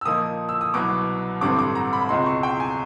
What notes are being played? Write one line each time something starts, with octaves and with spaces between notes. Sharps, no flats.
E6
A#2 F3 A#3 D#4 D#6
E6
D#6
C2 B2 F#3 B3 D6
A1 G2 D3 G3 C4 D6
D6
A#5
B5
C#2 B2 G#3 C4 D#4 C6
C#6
G5
G#5